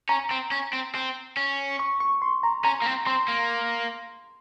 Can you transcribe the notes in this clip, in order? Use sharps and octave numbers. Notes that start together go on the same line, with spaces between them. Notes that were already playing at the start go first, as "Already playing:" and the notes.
C#4 A#5
C4
C#4
C4
C4
C#4
C#6
C#6
C6
A#5
C#4 A#5
A#3
C4
C4 C6
A#3